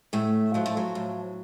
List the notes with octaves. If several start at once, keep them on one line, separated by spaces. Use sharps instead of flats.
A2 A3
F3 F#3
A3
F#3
A2